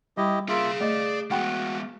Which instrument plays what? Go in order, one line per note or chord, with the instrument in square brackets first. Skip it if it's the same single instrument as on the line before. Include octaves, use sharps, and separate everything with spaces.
[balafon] G3 [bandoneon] E4 G4 D#5
[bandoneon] A#3 F4 E5 [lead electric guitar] G#4 F5
[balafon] A3 D#5 [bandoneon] D5
[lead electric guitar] G#3 B3 [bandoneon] F#4 [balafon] F#5 G5 B5